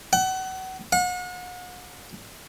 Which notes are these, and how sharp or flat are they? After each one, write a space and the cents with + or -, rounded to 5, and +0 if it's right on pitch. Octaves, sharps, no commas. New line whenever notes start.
F#5 +30
F#5 -40